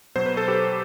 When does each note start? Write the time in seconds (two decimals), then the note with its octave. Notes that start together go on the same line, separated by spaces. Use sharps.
0.16 B2 F#3 C5
0.26 B4
0.37 A4
0.48 G4 B4